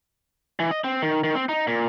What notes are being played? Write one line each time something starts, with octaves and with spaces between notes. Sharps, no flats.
E3
D#5
C4
D#3
D#3
C4
D#4
A#2